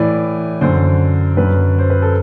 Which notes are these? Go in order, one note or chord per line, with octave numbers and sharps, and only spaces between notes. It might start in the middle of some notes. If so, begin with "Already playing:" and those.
Already playing: A2 E3 D5
F#2 D3 C5
F#2 D3 B4
C5
B4
A4